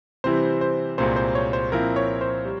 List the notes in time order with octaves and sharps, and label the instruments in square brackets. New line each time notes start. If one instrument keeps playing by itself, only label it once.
[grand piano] C3 E3 G3 C4 E4 [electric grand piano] C5
[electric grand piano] C5
[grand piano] C2 A#2 G#3 C4 [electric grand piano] C5
[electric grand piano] C5
C#5
C5
[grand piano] A#2 F3 C4 E4 [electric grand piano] A#4
[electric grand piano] C#5
C5
[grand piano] G3